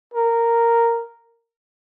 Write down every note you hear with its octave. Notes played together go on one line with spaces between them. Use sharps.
A#4